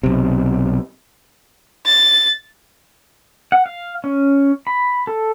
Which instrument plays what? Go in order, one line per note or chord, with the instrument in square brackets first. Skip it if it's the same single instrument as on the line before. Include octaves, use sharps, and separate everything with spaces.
[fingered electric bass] B1 C3
[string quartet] A6
[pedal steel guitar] F#5
F5
C#4
B5
A4